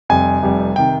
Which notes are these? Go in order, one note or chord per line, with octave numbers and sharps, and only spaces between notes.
F1 F2 C3 G3 G#5
F1 F2 C3 G3
C3 D#3 G5